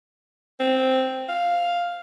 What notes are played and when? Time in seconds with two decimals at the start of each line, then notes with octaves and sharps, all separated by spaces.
0.60 C4
1.29 F5